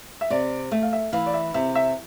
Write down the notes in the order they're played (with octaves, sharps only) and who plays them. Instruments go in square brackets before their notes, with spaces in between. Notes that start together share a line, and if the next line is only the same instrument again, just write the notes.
[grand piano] E5
[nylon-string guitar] C3 [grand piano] D5
[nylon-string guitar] A3 [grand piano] E5
[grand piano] F5
E5
[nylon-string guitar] E3 [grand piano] F5
[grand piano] D5
E5
[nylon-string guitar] C3 [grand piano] E5
[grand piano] E5